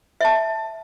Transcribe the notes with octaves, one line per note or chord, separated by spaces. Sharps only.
E5 A5